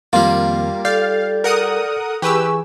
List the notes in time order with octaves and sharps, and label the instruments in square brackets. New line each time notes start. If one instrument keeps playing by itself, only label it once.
[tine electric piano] F2 D#3 [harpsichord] G3 F4 [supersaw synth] A#3
[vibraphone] A4 [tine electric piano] D5 G6 [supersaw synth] F5
[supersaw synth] A#4 F#5 D#6
[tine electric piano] E3 [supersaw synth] G4 B4 E6 [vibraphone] G#4 G#5 C#6